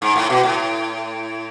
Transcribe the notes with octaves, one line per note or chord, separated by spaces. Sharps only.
G#2
A2
B2
A2